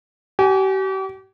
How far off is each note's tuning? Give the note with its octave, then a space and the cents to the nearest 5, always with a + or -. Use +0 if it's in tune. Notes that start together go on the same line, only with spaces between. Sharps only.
G4 -40 G#5 +0